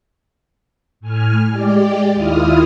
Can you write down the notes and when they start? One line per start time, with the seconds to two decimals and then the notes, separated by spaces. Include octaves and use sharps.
1.00 A2 G#5 F6
1.50 G#3 G4 D5
2.15 D#2 D#3 E4 F4 D#6 F6